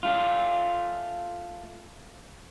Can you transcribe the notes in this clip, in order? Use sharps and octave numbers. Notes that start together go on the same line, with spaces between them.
A3 F4